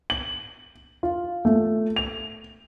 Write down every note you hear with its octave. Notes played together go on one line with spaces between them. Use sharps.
F#7
F4
A3
F7